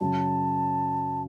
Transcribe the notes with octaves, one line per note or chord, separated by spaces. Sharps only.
F#2 C#3 F#3 A5